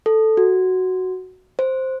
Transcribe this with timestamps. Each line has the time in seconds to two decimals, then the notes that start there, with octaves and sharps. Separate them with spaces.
0.06 A4
0.37 F#4
1.59 C5